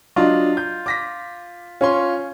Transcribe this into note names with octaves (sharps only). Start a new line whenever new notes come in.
F#3 D4 F4 D#5
G6
D6 A#6 B6
C#4 F4 C#5 C6